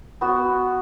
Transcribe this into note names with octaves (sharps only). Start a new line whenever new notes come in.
B3 F#4